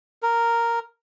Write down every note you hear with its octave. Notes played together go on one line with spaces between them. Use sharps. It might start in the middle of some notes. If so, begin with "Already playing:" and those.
A#4